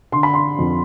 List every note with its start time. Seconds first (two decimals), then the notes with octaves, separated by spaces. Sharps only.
0.12 D3 C6
0.23 B5
0.34 C6
0.59 F2